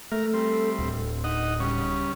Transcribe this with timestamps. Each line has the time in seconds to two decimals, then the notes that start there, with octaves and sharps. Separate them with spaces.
0.12 A3 A#4 F6
0.34 G3 C4
0.78 D1
1.24 D#4 D#5 F#5
1.60 C#3 G3 C#4